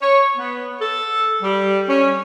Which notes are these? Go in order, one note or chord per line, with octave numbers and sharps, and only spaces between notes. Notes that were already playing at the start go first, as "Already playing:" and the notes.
C#5
B3
A4
G3
C#4